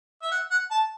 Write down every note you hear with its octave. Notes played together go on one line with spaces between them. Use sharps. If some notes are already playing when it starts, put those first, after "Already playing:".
E5
F#5
F#5
A5